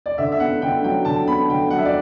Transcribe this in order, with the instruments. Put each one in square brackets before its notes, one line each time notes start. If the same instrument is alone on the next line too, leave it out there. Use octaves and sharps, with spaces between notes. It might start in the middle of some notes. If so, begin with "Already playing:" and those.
[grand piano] D5
D3 E5
E5
B3 F#5
D3 G5
F#3 G5
D3 A5
B3 B5
D3 G5
F#3 F#5
E5
D5